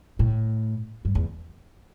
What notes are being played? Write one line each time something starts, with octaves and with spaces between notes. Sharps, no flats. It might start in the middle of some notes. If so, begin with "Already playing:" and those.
A2
G2
E2